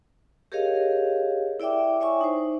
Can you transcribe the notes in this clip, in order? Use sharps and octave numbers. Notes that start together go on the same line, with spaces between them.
G4 G#4 A#4 C#5 D#5 F5
E4 D5 E5 G5 D6
C#5 E5 G#5 C#6
D#4 C5